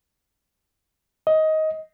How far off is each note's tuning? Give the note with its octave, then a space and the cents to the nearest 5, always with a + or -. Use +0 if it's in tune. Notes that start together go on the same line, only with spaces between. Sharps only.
D#5 +15